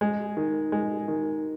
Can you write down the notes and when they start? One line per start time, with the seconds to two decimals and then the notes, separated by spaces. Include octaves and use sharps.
0.01 G#3
0.37 D#3
0.72 G#3
1.08 D#3